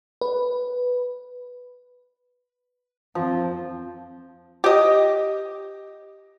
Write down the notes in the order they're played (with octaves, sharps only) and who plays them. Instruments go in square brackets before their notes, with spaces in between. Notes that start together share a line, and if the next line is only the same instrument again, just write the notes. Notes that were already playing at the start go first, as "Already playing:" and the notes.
[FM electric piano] B4
[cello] F2 C4 [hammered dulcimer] F3
[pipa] G4 D#5